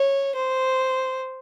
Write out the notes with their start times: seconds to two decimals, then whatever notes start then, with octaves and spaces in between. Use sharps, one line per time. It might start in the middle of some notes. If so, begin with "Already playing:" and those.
Already playing: C#5
0.36 C5